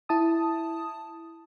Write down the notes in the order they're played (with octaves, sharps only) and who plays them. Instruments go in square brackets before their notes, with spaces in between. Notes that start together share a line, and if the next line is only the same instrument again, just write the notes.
[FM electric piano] E4 A5 D#6